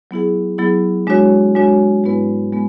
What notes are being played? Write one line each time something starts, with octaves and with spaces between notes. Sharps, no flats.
F#3 B3 E4 G#4
F#3 B3 E4 G#4
G#3 D4 F#4 C#5
G#3 D4 F#4 C#5
G#2 G#3 B3 E4 B4
G#3 B3